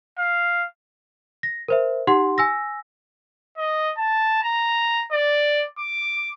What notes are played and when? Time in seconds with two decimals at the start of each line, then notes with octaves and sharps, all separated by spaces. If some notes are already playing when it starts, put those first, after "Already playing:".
0.18 F5
1.43 A#6
1.68 A#4 C5 E5
2.07 D#4 G4 F#5 C6
2.38 G#5 E6 A#6
3.57 D#5
3.97 A5
4.43 A#5
5.12 D5
5.79 D6